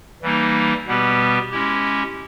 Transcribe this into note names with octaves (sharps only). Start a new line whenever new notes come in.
E3 G3 A#3 D#4
B2 G3 B3 G4 B4
G#3 C#4 E4 G4